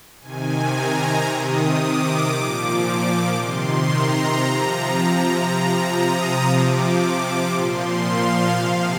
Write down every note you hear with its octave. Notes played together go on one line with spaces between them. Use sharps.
C3 D#3 G#5
A#5
C3 D#3 D#6
D6
A#2 F3
C3 D#3 C6
A#5
C3 F3
C3 F3 A#5
D#6
C3 F3 D6
A#2 F3 C6
F5
C3 F3 F5